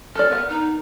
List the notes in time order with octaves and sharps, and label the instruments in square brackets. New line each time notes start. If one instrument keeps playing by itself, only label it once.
[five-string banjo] A4 D5 [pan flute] F6
[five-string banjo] B3 A#4 F#5
[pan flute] D#4